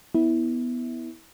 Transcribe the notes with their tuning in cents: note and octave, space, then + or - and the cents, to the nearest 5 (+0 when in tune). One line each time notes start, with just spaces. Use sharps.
B3 +0 E4 -20